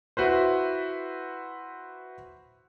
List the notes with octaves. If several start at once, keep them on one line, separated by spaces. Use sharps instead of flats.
E4 F#4 B4 C5